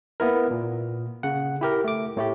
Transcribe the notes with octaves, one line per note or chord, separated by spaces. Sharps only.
A#3 B3 E4 A#4
A#2
C#3 F#5
E4 G4 A#4
A3 D6
A2 A3 G4